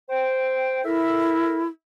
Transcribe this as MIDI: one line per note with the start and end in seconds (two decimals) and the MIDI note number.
0.10 0.82 72
0.10 0.82 79
0.85 1.67 64
0.85 1.63 69
0.85 1.63 70
0.85 1.63 76